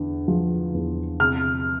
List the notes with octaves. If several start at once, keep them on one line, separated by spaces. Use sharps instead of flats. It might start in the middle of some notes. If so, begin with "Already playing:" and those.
Already playing: E2 D3
F3
E2
C3 F6